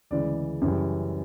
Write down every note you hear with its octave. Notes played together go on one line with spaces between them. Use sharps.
D2 C#3 E3 G#3 D5
F#2 C#3 E3 G3